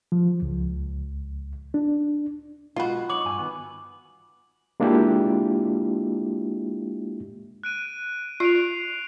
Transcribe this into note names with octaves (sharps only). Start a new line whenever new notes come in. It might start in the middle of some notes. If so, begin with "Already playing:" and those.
F3
C#2
D4
B1 G#3 F4 F#4 B5
D#4 C#5 D6 F#7
G2 G#5
D#3 B3
G#3 A#3 D4 E4 F4 G4
F#6 D7 D#7
F4 C7 D7 F7